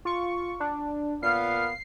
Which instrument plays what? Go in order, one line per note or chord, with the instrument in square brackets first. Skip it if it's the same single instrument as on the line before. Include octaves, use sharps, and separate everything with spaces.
[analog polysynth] F4 C#6
D4
[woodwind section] A#2 B3 F5 [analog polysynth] C7